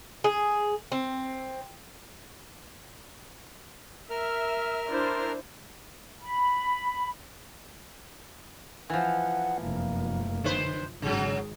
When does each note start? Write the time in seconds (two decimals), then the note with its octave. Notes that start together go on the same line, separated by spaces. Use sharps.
0.24 G#4
0.92 C4
4.10 A#4 E5 F6
4.89 D4 E4 C5
6.22 B5
8.90 E3 F3 F#5
9.61 F1 F#2 A#3
10.44 D3 B4 C5
11.02 G#1 C#3 F#3 G#4